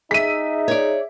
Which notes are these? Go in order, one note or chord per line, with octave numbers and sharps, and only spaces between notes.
D#4 G#4 E5 B6 D#7
C#5 D5